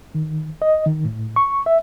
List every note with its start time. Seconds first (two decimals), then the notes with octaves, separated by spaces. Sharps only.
0.15 D#3
0.62 D#5
0.86 D#3
1.05 A2
1.36 C#6
1.66 E5